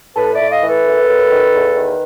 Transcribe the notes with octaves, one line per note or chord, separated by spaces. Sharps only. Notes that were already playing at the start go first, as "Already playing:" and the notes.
A2 A4 B4
D5 E5
A2
D#5 F5
E3
A4 B4
F#2
F#2
D#3
E2
D#3